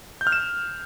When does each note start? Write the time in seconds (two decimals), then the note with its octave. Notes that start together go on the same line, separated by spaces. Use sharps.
0.21 G6
0.27 F6
0.32 E7